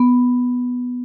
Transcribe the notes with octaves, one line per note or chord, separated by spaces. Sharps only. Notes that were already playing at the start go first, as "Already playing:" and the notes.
Already playing: B3